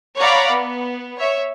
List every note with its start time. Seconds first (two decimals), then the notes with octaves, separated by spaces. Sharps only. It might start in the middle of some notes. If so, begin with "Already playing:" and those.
0.18 C#5 D5 F5 F#5 A#5 B5
0.51 B3
1.17 C#5 E5